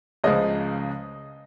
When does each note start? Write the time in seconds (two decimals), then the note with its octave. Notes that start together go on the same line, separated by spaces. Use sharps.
0.24 C#2 C#3 F3 G#3 D#5